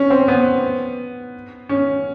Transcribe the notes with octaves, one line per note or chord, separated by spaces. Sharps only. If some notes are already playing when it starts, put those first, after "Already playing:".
Already playing: C#4
C4
B3
C#4